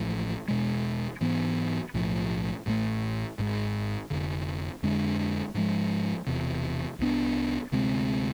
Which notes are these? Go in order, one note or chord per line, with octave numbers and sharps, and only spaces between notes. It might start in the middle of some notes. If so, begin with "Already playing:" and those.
Already playing: A1 A2 F3
E1 E2 B2 G#3
G#2 E3 B3
B1 A2 F3
A1 A2 F3 A3
G#1 G#2 G#3
F1 F2 D3
F2 D3 G#3 D4
G#2 F3 G#3
E1 E2 C3
C2 B2 B3 D4
D2 C3 G#3 C4